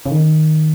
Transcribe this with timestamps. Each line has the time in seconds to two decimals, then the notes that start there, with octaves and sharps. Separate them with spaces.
0.06 C#3
0.11 D#3